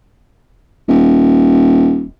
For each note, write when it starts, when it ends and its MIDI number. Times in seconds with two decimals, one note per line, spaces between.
0.88 2.06 27